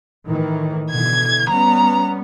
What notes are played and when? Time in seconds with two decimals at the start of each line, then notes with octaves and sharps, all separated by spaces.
0.28 A2 D#3 E3
0.91 B2 D3 E3 G#6
1.49 G3 B3 C#4 A#5